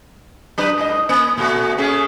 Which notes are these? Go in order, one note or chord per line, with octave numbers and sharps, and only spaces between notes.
F#3 D4 B4
G#2 D#5
A#3
A#2 A3 F#4
A3 C#4 G#4